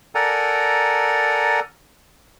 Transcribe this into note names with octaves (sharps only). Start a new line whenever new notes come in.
A4 A#4 D5 F#5 G#5 A#5